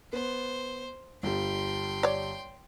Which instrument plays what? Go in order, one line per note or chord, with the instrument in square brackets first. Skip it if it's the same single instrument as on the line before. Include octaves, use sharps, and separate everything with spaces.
[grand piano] B3 [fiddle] C5
[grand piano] G1 G3 [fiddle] G5 C6
[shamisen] C#5 D5